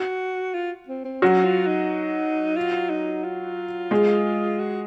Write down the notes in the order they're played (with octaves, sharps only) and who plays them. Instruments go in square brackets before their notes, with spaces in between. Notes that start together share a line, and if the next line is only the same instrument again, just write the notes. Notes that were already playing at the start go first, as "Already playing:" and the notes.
Already playing: [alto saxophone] F#4
F4
C4
C4
[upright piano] F#3 F#4 [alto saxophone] C#4
[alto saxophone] F4
D#4
F4
D#4
F4
[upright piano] G#3 G#4
[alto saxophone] F#4